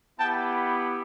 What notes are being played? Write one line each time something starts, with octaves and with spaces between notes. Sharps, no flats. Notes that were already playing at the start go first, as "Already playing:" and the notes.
B3 E4 G4 G5 A5